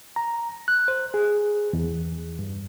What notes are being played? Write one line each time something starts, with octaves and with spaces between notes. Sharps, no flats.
A#5
F#6
C5
G#4
E2
G2